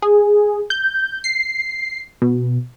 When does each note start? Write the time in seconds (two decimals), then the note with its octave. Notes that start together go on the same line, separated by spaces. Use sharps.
0.02 G#4
0.70 G6
1.24 C7
2.22 B2